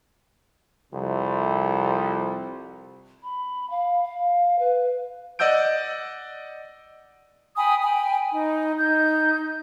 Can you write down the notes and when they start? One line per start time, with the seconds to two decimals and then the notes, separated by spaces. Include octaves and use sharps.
0.93 C2 F2 C3
3.23 B5
3.70 F5
4.03 F5
4.59 B4
5.39 D5 D#5 F#5 E6 G6 D7
7.56 G5 G#5 B5 D#6
7.82 G5 G#5 B5
8.32 D#4
8.77 D#4 G6